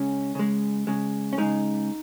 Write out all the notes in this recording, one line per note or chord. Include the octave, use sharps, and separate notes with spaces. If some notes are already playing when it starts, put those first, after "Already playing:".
Already playing: C#3 G#3 C#4
C#3 G#3
C#3 G#3
C#4
C#3 G#3 D#4